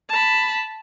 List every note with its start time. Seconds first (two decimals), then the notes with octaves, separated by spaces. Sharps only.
0.10 A5 B5